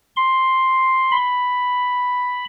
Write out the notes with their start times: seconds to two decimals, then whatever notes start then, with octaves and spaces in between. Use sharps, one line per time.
0.16 C6
1.12 B5